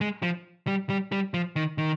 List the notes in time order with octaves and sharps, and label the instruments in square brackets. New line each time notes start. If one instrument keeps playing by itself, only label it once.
[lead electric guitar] G#3
F3
G3
G3
G3
F3
D#3
D#3